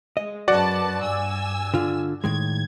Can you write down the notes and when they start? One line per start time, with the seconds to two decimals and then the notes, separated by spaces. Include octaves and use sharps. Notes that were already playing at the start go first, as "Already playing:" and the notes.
0.17 G#3 D#5
0.48 F#2 F#4 B4 D5 F#5 A5
1.03 G2 G#5 E6
1.74 D3 F4
2.24 A2 D#3 G#3 G#6